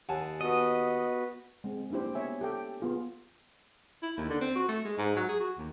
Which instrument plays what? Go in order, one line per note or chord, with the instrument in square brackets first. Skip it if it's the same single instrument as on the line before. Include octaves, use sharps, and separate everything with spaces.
[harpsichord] D#2 [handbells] F#5 G#5 A5
[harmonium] B3 F#4 [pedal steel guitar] D#5 [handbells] D#6
[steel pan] G#3 C4
A#3 D4 E4 G4 C5
B3 C#5 E5 G#5
G4 A4 G5
B3 F4 G#4
[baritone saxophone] E4
D#2
D3
C4
F#4
A3
G#3
G#2
F#3
G#4
F#4
D#2